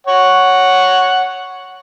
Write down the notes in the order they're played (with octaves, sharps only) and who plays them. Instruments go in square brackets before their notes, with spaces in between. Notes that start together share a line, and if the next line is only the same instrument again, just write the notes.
[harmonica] C#5 F#5